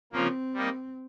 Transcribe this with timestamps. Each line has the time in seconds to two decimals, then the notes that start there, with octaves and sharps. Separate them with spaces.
0.13 C#3 F3 A#3 C4 F4
0.54 G3 A#3 D#4